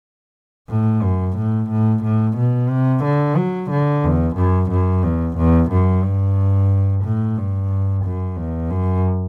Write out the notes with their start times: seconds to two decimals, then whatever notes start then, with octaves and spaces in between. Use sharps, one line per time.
0.69 A2
1.03 F#2
1.37 A2
1.70 A2
2.04 A2
2.37 B2
2.70 C3
3.04 D3
3.36 F#3
3.71 D3
4.04 E2
4.36 F#2
4.71 F#2
5.03 E2
5.37 E2
5.71 F#2
6.04 G2
7.04 A2
7.37 G2
8.05 F#2
8.37 E2
8.70 F#2